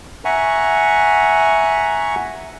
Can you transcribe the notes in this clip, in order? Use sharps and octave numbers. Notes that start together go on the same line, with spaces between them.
E5 F#5 G#5 A#5 C#6